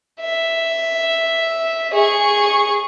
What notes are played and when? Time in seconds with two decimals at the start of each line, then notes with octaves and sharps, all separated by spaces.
0.21 E5
1.93 G#4 C#6